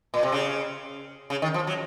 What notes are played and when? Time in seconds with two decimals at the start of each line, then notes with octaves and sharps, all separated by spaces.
0.14 A#2
0.23 C3
0.32 C#3
1.30 C#3
1.42 D#3
1.54 F3
1.67 F#3